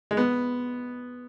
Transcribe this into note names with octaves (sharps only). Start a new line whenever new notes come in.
G#3
B3